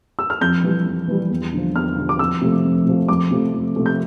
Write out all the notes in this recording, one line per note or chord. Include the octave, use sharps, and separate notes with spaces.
E6
F6
F2 G6
E3 G3
F2
E3 G3
E2
D3 F3
E2 F6
D3 F3
D6
F2 E6
C3 F3 A3
F2
C3 F3 A3
F2 D6
C3 F3 A3
F2
C3 F3 A3
G6